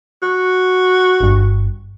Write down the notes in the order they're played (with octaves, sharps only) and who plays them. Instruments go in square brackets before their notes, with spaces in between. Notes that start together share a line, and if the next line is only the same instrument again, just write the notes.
[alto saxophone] F#4
[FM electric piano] G1 G2